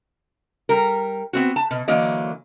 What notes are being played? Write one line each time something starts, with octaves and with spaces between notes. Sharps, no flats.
G3 A#4
B3 C4 F#4
A5
B2
D3 E3 F#3 A#3 D5 D#5